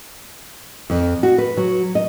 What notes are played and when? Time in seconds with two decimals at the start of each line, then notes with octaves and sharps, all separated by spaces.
0.90 F2
1.23 F#4
1.38 B4
1.57 F#3
1.95 D#5